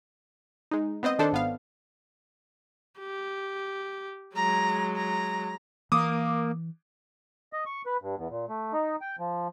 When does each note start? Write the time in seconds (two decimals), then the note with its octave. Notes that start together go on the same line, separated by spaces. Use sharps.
0.71 G#3 D#4
1.03 B3 C4 C5 D#5
1.19 D#3 D4 A4 C5
1.32 G#1 B3 F5
3.00 G4
4.36 F#3 G#3 A#5
4.96 A#5
5.92 E3 A#3 D6 D#6
7.53 D#5
7.66 C#6
7.86 B4
8.02 G2
8.17 E2
8.30 A#2
8.49 A3
8.73 D#4
9.01 G5
9.19 F3